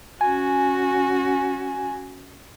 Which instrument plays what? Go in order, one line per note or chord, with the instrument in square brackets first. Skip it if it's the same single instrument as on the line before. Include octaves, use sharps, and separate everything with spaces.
[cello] C#4 F#4 [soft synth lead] G#5